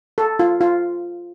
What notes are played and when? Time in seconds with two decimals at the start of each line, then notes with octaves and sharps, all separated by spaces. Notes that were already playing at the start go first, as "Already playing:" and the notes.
0.18 A4
0.39 F4
0.61 F4